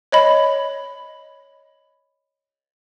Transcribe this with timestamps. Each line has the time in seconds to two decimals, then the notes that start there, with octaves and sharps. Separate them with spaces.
0.12 C#5 D#5 B5